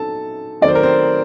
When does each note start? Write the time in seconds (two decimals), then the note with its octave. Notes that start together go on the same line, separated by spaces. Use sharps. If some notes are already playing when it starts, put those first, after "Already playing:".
Already playing: F#3 C4 D#4 A4 A5
0.61 D#3 F#3 A3 C4 D5
0.68 C5
0.75 A#4
0.83 C4 C5